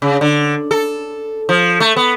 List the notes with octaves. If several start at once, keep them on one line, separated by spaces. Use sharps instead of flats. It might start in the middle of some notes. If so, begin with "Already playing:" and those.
C#3
D3
A4
F3
A3
B3